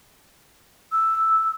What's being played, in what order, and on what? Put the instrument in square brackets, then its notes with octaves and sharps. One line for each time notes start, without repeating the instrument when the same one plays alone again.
[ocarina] E6